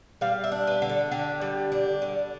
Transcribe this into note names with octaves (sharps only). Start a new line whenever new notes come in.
G3 F5
E5
D4
B4
D3
A4
D3 G4
G3
D4
D3